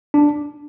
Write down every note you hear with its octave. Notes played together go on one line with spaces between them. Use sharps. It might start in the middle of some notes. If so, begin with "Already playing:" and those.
D4